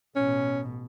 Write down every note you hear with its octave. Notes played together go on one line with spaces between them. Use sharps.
A1 B2 C#4